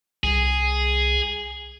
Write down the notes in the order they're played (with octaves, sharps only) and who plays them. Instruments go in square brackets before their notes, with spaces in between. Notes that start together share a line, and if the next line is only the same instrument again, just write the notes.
[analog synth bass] C2 [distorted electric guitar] G#4